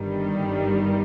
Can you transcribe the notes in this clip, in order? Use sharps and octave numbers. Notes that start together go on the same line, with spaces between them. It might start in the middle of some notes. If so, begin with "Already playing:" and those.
Already playing: G1 G2 D#3 G3